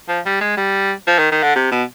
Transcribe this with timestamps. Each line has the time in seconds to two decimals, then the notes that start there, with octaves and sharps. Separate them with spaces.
0.08 F3
0.25 G3
0.41 G#3
0.57 G3
1.07 F3
1.19 D#3
1.32 D#3
1.43 D3
1.56 C3
1.71 B2